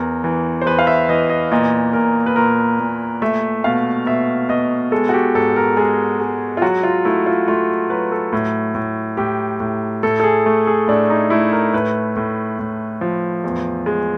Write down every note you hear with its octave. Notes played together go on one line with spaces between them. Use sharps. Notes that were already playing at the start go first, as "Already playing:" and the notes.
Already playing: E2 A#4
E3
C5
E2 B4
F5
E5
E3 D#5
D#5
A#2 D#5
A#2 A#4
B4
A#2 A#4
A#2
A3 E5
B2 F5
B2 E5
B2 D#5
G#3 A4
F#4
G4
G#2 A4
A#4
G#3 G#4
G#3
F4
F#3 F#4
F4
A3 E4
F4
A3 F4
F#3 B4
A4
A2
A2
A2 G4
A2
A2 A4
A4
G#4
A3
G#4
A2 D4
D#4
A3 E4
A#4
A2 B4
A2
A2
F3
E2
G#3